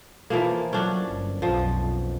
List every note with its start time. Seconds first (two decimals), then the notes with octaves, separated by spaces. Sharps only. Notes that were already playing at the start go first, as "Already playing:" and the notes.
0.30 E3 F3 A#3
0.73 F#3 C#4 D4
1.06 G1
1.42 B1 F2 F3